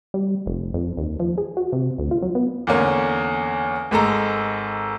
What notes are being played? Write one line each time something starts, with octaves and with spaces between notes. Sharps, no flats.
G3
F1
F2
D#2
F3
G#4
F#4
C3
D2
F4
F#3
B3
E2 D3 A#3 C#4
G#1 G#3 A4 A#5